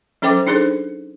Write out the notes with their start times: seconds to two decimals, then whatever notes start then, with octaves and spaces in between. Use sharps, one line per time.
0.22 F#3 C#4 A4 C5 G5 D6
0.47 D4 D#4 G#4 A4 C5